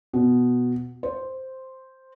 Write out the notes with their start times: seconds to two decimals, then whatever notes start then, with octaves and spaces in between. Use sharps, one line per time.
0.13 B2
1.03 C5